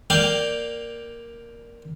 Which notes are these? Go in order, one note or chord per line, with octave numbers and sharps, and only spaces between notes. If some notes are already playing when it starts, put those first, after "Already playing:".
A#3 D5 F5 G5